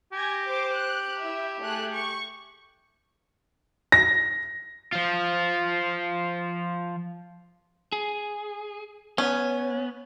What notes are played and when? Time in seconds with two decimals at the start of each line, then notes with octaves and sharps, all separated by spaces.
0.13 G4 G#5 G#6 A#6
0.45 C5 D6
0.74 F#6
1.21 E4 E5
1.62 A3 G#4 F#6
1.94 C#6
3.92 A#6
4.93 F3 F4
7.92 G#4
9.18 B3 C#4 C#5